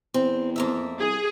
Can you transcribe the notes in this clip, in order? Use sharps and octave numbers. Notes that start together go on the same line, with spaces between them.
E2 C4
F2 A#3 E5
C2 G#4